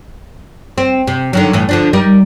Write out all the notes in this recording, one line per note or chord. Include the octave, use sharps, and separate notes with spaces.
C4
C3
D3 D#3 F#3
A2 E3
D3 F3 D4
G3 D#4 A#4